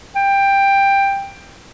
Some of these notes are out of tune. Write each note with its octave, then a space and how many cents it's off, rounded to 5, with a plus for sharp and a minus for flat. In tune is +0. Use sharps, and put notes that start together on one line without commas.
G5 +15